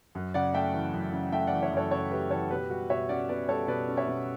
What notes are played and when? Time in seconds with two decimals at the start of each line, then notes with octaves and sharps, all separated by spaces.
0.15 F#2
0.34 C#3 D5 F#5
0.54 A3 E5 G5
0.74 E3
0.94 F#2
1.13 C#3
1.32 A3 E5 G5
1.47 E3 D5 F#5
1.62 C#5 E5
1.72 F#2 A4 C#5
1.91 C#3 A4 C#5
2.11 A3 G4 B4
2.31 E3 A4 C#5
2.50 B2 G4 B4
2.70 G3 F#4
2.90 B2 C#5 E5
3.09 C#4 D5 F#5
3.29 B2 B4 D5
3.48 G3 A4 C#5
3.68 B2 B4 D5
3.88 C#4
3.97 C#5 E5
4.08 B2